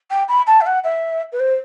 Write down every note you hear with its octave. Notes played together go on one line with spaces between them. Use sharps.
G5
B5
A5
E5
F#5
E5
B4
C5